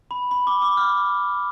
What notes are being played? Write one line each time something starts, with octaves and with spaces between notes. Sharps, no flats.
B5
B5
D6
D6
F6